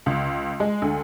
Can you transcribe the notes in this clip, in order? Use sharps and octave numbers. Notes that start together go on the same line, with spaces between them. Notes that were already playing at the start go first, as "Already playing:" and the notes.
C#2
G#3
D2